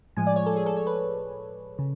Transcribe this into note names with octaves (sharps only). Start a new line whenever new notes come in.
A2 F3 G#3 G#5
D5
C#5
A4
G#4
A4
C#5
B4
C#3